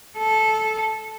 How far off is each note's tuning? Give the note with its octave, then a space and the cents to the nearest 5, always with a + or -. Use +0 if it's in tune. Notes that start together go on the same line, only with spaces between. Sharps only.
A4 -10